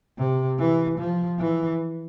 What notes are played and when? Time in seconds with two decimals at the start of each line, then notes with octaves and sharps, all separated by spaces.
0.18 C3
0.59 E3
0.99 F3
1.39 E3